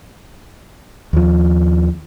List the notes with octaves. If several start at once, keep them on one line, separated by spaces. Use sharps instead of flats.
D#2 F3